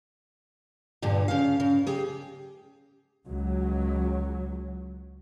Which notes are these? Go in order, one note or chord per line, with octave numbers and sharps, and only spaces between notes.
E2 G2 A#2 D3
C#3 F5
C#3
G4 G#4
C#2 F#3